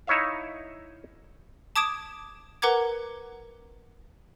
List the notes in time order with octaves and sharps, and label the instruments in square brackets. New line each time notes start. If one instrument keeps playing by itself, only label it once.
[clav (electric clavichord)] D#4 E4 C#5 E5 F5
[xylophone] A5 D6 D#6 G#6 D7 E7
A#4 B4 F#5 A#5 D6 G#6